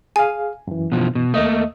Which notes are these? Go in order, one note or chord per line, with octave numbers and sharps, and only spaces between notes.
G#4 F5 G#5
F#2 E3
B2 F3
B2
D#2 A3 A#3 D#5 D#6